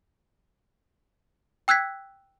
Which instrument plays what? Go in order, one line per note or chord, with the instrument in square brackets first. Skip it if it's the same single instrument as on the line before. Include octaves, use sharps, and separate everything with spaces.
[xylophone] G5 E6 F#6 G#6 B6